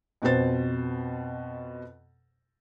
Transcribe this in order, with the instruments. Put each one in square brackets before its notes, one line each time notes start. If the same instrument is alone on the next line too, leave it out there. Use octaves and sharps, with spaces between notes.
[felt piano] F2 B2 B4 C5 A6